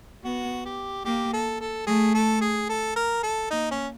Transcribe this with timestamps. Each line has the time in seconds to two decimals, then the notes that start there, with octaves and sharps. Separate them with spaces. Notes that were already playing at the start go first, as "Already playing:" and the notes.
0.24 B3 F#4
0.65 G4
1.05 A#3 G4
1.33 A4
1.61 A4
1.87 A3 G#4
2.14 A4
2.41 G#4
2.69 A4
2.96 A#4
3.23 A4
3.51 A#3 D#4
3.71 C#4